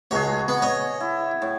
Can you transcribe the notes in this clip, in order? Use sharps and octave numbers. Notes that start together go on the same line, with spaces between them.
C#2 F#4 G#4 C#5
B3
C#5 D#5
E4
A2